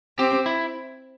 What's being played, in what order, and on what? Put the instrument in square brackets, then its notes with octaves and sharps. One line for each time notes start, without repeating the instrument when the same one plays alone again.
[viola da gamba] C4 [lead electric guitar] G4
[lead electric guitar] E4